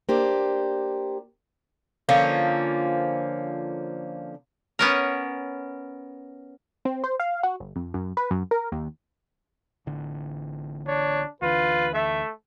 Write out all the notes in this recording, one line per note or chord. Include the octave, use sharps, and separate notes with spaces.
A#3 D4 G4 C5
D3 F3 A#3 C#4
B3 C#4 A#4
C4
C5
F5
F#4
G1
F2
F#2
B4
F#2
A#4
D#2
A1 D3
D4 C#5
D2 E3 D4 F4 B4
A3 E5